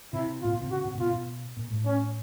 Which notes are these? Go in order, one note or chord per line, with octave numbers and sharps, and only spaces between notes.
C3 E4
A#2 F4
B2
C3
C#3 F#4
C3
A#2
B2 F4
B2
A#2
A2
C#4